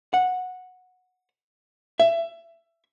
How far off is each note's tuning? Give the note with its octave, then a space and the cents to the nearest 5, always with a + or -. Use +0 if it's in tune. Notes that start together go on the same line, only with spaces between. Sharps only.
F#5 -10
E5 +20